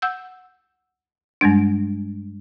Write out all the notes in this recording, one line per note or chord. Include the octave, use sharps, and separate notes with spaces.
F#5 E6 G6
G2 G3 G#3 D4